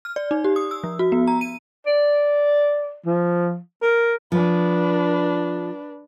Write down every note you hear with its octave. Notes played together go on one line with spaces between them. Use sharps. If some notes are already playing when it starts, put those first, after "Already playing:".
F6
D5
D#4
G4
D#6
E6
F3
F#4
B3
A#5
D#7
D5
F3
A#4
F3 D4 B4